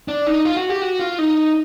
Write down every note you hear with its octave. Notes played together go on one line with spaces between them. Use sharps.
D4
D#4
F4
F#4
G4
F#4
F4
D#4